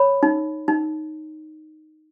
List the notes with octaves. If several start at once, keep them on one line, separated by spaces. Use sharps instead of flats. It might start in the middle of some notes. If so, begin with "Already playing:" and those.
Already playing: C#5 B5
D#4
D#4